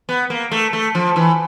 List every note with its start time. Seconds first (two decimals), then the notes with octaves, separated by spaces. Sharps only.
0.09 B3
0.30 A#3
0.52 A3
0.73 A3
0.95 F3
1.16 E3